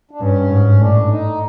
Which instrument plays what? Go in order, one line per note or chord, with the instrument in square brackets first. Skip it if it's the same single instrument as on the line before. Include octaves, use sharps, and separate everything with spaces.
[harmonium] D4
[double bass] G2 [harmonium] C#4
[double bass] G#2
[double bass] A2 [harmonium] D4
[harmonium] D#4